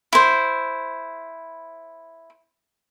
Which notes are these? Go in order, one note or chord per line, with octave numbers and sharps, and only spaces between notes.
E4 C5